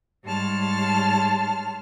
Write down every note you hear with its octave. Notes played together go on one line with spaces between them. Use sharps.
G#2 G3 C#5 A5 C6 F6